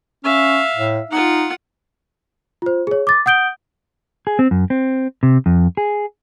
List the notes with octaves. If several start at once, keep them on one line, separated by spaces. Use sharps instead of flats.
C#4 E5 F5
A2
D#4 F4 F#5
F4 C5
G#4 C#5
D6 A6
F#5 D#6 G6 D7 G7
G#4
C4
F#2
C4
C3
F2
G#4